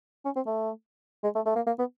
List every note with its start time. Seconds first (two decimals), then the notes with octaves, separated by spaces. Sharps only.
0.25 C#4
0.36 C4
0.47 A3
1.24 G#3
1.35 A3
1.46 A3
1.56 A#3
1.67 A#3
1.79 B3